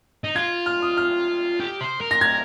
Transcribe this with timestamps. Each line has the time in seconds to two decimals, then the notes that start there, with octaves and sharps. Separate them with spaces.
0.24 D#4
0.36 F4 G#6
0.66 F6
0.82 D#6
0.97 F6
1.60 G4
1.80 C5
2.01 A#4
2.11 A#6
2.21 G#6